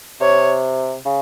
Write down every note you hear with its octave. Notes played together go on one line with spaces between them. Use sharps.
C3 C#5
C#3